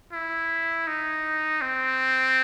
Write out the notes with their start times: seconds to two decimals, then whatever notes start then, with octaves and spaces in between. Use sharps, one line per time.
0.12 E4
0.87 D#4
1.61 C4